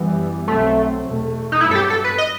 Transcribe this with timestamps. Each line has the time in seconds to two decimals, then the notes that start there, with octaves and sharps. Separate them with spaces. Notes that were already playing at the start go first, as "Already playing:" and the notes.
Already playing: F#2 E3 G3 B3
0.46 B1 B2 F#3 A3 C4
1.04 E2 B2 A3
1.52 D#4
1.61 G2 F#3 B3 E4
1.71 A4
1.75 G4
1.90 A4
2.04 B4
2.18 D#5